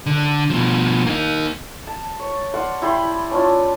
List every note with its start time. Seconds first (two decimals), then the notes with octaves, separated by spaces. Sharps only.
0.06 D3
0.50 B2 F3
1.06 A#3 D#4
1.87 A5
2.19 C#5
2.54 D5 F5 F#5 C6
2.82 E4 G4 B5 C6
3.31 C#4 D4 F4